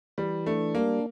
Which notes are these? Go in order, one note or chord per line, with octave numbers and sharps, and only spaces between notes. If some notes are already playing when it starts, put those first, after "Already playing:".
E3 G3
A3 D4
G3 A#3